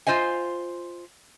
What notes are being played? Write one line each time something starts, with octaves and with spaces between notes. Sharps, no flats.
F4 C5 D#5 G#5